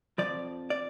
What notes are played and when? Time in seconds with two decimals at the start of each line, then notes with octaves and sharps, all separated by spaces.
0.18 F2 C3 F3 D5
0.70 D5